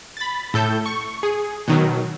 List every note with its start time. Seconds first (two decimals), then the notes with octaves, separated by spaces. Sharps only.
0.17 B5 A6
0.54 A2 A4 G6
0.86 C#6
1.23 G#4
1.68 B2 D#3 F#3